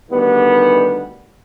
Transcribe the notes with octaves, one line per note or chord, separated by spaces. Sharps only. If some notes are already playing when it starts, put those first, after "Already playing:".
D2 D#3 G3 B3 G4